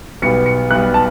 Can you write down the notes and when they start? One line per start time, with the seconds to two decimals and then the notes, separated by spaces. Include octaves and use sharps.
0.22 B1 B2 G3 B3 C#7
0.46 C#7
0.71 B1 B2 G3 B3 F#6
0.94 A5